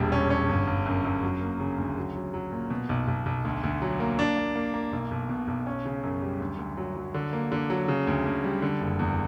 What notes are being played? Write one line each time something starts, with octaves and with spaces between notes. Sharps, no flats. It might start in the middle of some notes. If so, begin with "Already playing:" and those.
Already playing: E1 A#1 G3
C#4
C#4
G1
G1
F#2
F#2
F#3
A#3
C#3
D2
F#3
F#3
F#3
A#2
B2
B1
B1
B1
D2
D2
F#3
A#3
D4
A#3
A#3
A#3
B1
B1
B2
B1
C#4
C#3
F#2
G3
D2
D2
F#3
F#3
D3
A#3
D3
F#3
C#3
D2
D2
G3
D3
F#1
E2